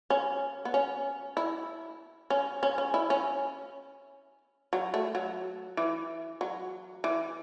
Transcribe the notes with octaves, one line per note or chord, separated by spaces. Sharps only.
C#4
B3
C#4
E4
C#4
C#4
C#4
E4
C#4
F#3
A3
F#3
E3
F#3
E3